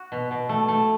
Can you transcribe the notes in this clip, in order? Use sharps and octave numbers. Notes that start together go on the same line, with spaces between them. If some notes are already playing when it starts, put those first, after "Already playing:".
Already playing: F#4
B2
B2
A3
A3